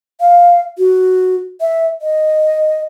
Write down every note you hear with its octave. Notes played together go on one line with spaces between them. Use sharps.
F5
F#4
E5
D#5